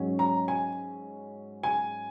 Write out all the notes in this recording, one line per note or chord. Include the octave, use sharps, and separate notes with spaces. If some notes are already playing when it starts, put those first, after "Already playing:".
Already playing: G#2 F#3 C#4
A#5
G#5
G#5